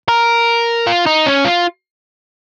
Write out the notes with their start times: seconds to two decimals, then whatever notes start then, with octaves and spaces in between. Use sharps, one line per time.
0.08 A#4
0.87 F4
1.06 D#4
1.26 C#4
1.45 F4